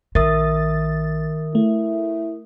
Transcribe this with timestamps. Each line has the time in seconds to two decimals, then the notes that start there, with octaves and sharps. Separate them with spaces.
0.15 A#1 D#3 A#4 E5 D#6 A6
1.55 A3 E4